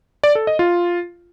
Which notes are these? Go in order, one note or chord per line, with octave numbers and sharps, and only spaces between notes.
D5
A4
D#5
F4